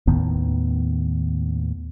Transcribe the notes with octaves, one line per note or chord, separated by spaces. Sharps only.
D#2 A2 D#3 B3